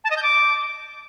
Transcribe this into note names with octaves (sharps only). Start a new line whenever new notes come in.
A5
D#5
G6
D6